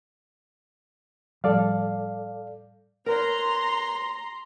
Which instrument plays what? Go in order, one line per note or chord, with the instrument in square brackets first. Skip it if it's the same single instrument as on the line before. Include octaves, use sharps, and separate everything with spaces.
[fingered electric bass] A2 F3 G3 [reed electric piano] A4 D5 F5
[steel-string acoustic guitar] A#4 B4 C#5 [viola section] A#5 C6